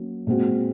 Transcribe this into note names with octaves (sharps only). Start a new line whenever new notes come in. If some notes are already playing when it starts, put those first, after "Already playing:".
Already playing: F#3 A#3 C#4
A#2 G#3 C4 F#4